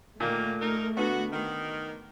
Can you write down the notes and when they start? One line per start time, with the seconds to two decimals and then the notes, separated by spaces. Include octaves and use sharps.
0.20 A#2 D#3 A3 A#3
0.61 D#4 A#4
0.97 D3 B3 F#4
1.32 D#3